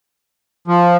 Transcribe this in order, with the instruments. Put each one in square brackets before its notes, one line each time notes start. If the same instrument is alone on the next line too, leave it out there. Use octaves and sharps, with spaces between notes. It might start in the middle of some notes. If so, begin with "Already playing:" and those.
[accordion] F3